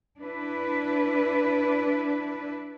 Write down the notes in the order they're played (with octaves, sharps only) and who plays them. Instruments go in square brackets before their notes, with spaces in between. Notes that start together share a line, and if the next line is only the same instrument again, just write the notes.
[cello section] D4 E4 B4